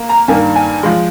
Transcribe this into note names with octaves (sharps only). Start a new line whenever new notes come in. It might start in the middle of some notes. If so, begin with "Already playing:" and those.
Already playing: A#3
A#5
G2 D#3 A#3 G#5
G#5
F3 G#3